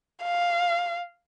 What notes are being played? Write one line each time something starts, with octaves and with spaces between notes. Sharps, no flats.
F5